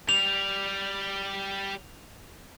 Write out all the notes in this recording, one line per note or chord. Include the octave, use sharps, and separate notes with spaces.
G3 G4 F7